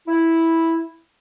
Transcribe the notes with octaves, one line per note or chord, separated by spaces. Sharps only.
E4